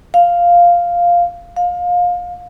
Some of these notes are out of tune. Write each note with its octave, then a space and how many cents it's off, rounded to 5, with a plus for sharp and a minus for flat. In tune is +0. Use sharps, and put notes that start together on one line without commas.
F5 +0
F5 +25